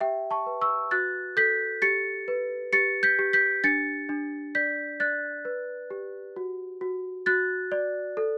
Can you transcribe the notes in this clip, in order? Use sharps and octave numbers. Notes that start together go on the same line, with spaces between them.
G4 E5 G5
A5 C#6
B4
C#6 E6
F#4 F#6 A6
A4 G6 B6
G4 A6 C#7
B4
G4 A6 C#7
G6 B6
G4
G6 B6
D4 A6 C#7
D4
D5 G6 B6
D5 F#6 A6
B4
G4
F#4
F#4
F#4 F#6 A6
D5
A4